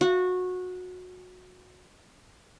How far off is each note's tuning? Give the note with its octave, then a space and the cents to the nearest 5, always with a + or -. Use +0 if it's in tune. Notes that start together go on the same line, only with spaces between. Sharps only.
F#4 -20